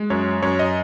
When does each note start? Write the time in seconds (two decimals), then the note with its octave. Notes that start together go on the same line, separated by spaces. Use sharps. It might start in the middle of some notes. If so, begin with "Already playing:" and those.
Already playing: G#3
0.10 F#2 C#5
0.42 F#2 C#5
0.59 D#5